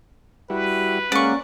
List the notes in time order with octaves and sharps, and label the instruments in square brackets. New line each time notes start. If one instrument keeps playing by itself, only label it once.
[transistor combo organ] G3 E4 F#4 [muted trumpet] B4
[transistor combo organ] G#3 [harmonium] A#3 C#4 F#5 [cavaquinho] D5 C#6